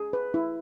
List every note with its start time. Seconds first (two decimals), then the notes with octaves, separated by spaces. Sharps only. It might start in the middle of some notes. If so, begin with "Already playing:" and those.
Already playing: G#4
0.13 B4
0.34 E4